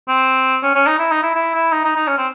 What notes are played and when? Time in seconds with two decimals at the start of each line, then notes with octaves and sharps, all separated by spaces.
0.08 C4
0.63 C#4
0.75 C#4
0.87 D#4
0.99 E4
1.12 D#4
1.23 E4
1.35 E4
1.54 E4
1.73 D#4
1.85 D#4
1.96 D#4
2.08 C#4
2.18 C4